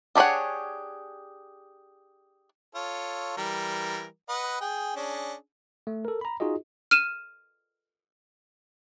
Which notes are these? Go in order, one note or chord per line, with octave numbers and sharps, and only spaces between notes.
D4 G4 G#4 C#5 F#5
F4 A4 C#5
E3 G3 A#4
B4 D#5 F#5
G#4 G5
C#4 D4 G#4
A3
A4 A#4
A#5 B5
D#4 F4 F#4 G#4 D#5
F6 D#7 E7